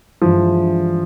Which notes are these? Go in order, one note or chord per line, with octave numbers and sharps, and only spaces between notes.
G2 E3 F3 G#3